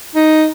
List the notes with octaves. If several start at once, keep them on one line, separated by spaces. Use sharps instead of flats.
D#4